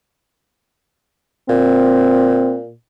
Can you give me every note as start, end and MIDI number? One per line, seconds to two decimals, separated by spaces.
1.49 2.73 46
1.49 2.57 60